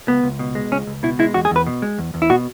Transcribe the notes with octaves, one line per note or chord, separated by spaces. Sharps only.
C#2 B3
C#2
B2
G#3
C#2 C#4
C#2
B2 E4
G#3 E4
E2 F#4
G#4
E2 B4
B2
G#3
E2
E2
E4
B2 F#4